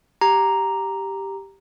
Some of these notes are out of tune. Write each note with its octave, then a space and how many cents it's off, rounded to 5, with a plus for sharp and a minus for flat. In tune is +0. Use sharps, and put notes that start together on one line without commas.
G4 +0 A#5 +0